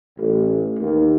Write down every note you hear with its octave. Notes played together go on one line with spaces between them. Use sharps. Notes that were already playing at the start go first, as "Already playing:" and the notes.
A1
D#2